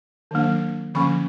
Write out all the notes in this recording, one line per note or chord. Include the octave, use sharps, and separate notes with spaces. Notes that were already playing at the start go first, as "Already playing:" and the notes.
D#3 F#3 A#3 D4
D3 F3 A#3 C#4 B5 C#6